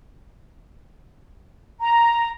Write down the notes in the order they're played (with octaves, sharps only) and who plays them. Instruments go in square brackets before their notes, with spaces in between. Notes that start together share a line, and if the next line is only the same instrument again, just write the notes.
[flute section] A#5